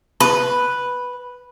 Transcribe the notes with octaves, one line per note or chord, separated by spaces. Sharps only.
B4